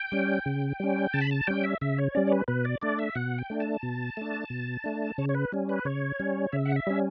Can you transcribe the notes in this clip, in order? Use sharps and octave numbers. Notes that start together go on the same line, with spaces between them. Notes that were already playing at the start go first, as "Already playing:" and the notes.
Already playing: G5
G3 C#4
C#3
G3 C#4
C#3 A5
B5
A5
G3 C#4 G5
E5
C#3 E5
C#5
G3 C#4 D5
C#5
B4
B2 B4
D5
A3 D4 D5
E5
B2 F#5
G5
A3 D4
A5
B2
A3 D4
B2
A3 D4
C#3 C#5
C#5
B4
G3 C#4
B4
C#3 C#5
G3 C#4
C#3 E5
F#5
E5
G3 C#4